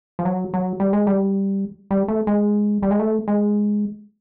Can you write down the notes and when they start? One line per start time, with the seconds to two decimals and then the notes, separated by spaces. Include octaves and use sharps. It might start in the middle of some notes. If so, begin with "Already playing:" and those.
0.19 F3
0.25 F#3
0.54 F#3
0.80 G3
0.93 G#3
1.07 G3
1.91 G3
2.08 A3
2.27 G#3
2.82 G3
2.91 G#3
3.00 A3
3.28 G#3